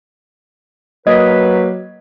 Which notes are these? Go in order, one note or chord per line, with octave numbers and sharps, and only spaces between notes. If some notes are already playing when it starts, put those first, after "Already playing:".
F#3 A#3 B4 D#5 G#6